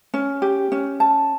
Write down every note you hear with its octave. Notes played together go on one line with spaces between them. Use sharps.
C#4
G4
C#4
A5